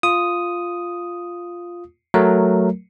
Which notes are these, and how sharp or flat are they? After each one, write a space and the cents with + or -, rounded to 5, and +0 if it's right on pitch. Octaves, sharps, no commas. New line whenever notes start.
F4 +0 D#6 +0
F#3 +0 A3 +0 A#4 +0